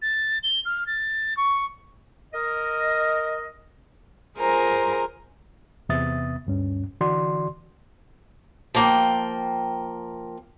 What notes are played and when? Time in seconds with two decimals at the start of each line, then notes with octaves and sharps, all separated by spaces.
0.02 A6
0.43 G7
0.65 F6
0.87 A6
1.37 C#6
2.34 A#4 D#5
4.38 F4 G#4 A#4 C5 G#5 A#5
5.89 E2 C3 B3 E5 D#6 A6
6.47 D2 G2 C#4
7.01 D3 E3 F#4 D5 C6
8.75 F3 A#3 G5